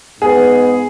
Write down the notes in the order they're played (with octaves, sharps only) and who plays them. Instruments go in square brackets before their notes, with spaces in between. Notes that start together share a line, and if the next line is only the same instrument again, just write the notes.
[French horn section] G#2 G#3 B3 [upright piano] G#4